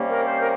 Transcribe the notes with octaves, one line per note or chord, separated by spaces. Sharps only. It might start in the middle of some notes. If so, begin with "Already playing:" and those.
Already playing: C3 G3 A#3 C#4
A#4
C5
A#4